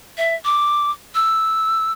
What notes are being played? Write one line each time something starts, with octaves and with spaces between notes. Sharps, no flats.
E5
D6
E6